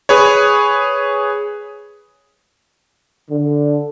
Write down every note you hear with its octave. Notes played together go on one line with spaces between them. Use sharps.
G#4 B4 C#5
D3